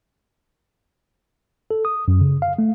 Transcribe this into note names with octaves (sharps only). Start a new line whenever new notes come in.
A4
D#6
F#2
C#3
F5
A3